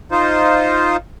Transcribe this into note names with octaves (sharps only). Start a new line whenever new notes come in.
D#4 F4 C5